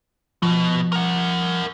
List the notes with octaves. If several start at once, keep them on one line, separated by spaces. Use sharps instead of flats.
B2 F3
A#4 F#5